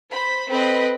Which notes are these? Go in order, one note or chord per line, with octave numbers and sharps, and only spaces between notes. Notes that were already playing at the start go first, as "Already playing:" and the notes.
C5 B5
C4 A4 B4 D#5 B5